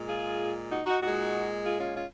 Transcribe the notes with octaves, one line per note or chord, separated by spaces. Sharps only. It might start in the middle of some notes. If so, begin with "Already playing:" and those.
Already playing: A#2 G#3
F4 G#4
D#4 F#4
D#4 F#4
A#2 G#3 D#4 F#4
F4 G#4
C#4 F4
C#4 F4